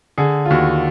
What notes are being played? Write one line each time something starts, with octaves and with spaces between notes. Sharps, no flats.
D3 G#4
F4
D#2 F#4